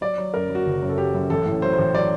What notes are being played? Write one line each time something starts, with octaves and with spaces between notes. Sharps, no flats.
F#3 D5
F#3
F#2 A#4
F#3
F#4
F#1
F#2
A4
F#3 G4
F#2
A1 A4
A2
F#3 C5
C5
A1
F#3 D5